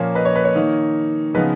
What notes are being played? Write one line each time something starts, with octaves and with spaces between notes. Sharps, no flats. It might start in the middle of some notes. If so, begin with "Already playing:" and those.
Already playing: A#2 F3 A#3 C#4 C#5
B4 D#5
C#5
B4
C#5
D#3 A#3 D#4
C#3 F3 B3 D#4 B4 D#5